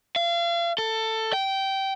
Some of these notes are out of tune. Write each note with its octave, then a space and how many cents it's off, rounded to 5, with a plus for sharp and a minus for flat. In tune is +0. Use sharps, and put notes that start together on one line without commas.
F5 -35
A4 +15
G5 -15